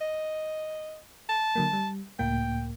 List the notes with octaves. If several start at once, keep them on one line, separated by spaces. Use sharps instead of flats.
D#5
A5
D3 F#3 A#3
G3
C#2 A2 A#3 G5